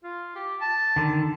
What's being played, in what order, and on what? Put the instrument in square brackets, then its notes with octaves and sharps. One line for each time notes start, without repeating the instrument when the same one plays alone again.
[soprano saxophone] F4
G4
A5
[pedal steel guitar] D3 D#3